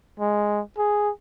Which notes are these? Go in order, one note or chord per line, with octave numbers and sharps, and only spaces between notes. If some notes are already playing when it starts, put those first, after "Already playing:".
G#3
G#4